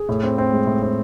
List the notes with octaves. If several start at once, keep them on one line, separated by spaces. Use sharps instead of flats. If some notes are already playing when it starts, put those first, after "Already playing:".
Already playing: G#4
A2
C4
C4
G#3
A2
C4